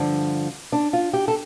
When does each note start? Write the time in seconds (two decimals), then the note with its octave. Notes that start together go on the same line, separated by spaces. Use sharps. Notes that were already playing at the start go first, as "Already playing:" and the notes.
Already playing: G2 D3 F3
0.72 D4
0.93 F4
1.14 G4
1.28 A4